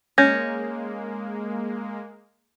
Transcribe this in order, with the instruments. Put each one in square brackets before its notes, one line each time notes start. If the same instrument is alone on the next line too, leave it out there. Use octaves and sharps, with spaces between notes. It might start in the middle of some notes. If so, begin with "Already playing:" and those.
[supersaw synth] G#3 A#3 [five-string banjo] C#4 [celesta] G6 G#6 A#6